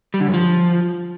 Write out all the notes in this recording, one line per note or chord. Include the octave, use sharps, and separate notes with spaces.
G3
D3
F#2
F3